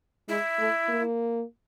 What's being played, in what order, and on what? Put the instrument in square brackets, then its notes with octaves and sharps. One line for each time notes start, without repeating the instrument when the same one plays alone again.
[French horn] G#3 [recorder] E4
[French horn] A3
A#3